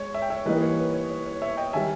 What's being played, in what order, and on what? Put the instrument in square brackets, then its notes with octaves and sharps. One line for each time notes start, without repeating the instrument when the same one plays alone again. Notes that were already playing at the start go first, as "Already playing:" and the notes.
Already playing: [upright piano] G#3 [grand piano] C#5
[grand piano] E5
G5
C#5 E5
[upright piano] E3 G3 A#3 D#4 [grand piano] B4 D#5
[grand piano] C#5
B4
C#5
C#5
C#5
C#5 E5
D#5 G5
[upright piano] D#3 G3 [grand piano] E5 G#5